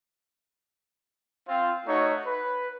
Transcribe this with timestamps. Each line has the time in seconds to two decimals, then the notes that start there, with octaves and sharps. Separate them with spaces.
1.47 C4 F4
1.86 A3 D#4 F#4 C#5
2.26 B4